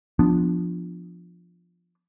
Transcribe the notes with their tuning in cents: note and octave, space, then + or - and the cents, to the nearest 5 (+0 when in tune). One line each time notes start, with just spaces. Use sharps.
F3 +0 B3 +0 D4 +0